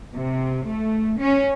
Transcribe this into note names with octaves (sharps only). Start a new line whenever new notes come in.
C3
A3
C#4